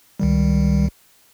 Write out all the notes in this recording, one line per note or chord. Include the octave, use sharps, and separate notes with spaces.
C#2 D#3 G3